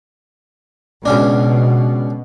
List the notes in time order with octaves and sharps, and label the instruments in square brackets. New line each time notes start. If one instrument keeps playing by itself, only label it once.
[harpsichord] C#2 C#4 D4 [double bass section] B2